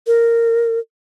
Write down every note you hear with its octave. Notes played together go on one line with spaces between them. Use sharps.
A#4